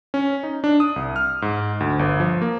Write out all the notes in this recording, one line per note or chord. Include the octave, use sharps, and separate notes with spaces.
C#4
D#4
D4
D#6
C2
F6
G#2
D2
G1
F3
A#3